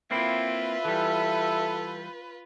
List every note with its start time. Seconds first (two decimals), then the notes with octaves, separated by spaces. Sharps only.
0.11 A#3 C4 E4 F4 B4 E5
0.85 E3 G3 A4